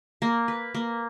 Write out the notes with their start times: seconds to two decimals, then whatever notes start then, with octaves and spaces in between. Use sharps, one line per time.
0.22 A#3
0.48 B4
0.75 A#3